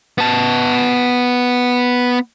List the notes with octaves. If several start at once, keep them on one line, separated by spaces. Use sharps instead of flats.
B3 A5